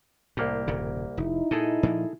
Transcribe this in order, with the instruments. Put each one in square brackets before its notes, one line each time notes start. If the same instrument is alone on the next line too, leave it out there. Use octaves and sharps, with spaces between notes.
[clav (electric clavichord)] C2 A#3 G4 [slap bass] A2
[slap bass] D#1 G2 C#3
[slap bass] F1 [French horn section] D#4 E4
[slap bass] A#2 [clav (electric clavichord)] G#4 A4 D#5
[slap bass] A#2 F3 A#3